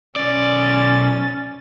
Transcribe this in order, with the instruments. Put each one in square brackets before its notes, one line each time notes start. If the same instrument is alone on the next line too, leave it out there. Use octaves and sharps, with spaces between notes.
[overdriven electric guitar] B1 D5 [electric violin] C#4 A6